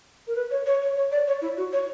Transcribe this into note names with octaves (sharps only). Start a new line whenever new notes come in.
A#4
B4
C#5
C#5
C#5
C#5
D5
C#5
E4
F#4
C#5